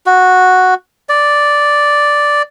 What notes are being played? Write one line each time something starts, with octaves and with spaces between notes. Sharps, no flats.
F#4
D5